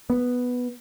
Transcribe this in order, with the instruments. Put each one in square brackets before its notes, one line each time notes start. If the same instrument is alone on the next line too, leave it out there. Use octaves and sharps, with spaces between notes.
[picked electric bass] B3